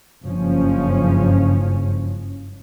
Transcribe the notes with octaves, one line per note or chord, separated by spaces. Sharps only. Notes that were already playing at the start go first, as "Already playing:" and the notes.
F#1 G2 C#3 F3 C#4